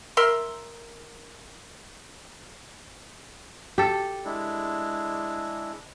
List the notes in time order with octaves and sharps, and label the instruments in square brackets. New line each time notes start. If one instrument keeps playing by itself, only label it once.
[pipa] A#4 E5 C6
[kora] G4 A4
[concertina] G#3 D4 E4